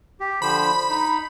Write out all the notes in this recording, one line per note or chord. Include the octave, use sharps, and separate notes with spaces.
G4
D3 F3 C5 B5
D#4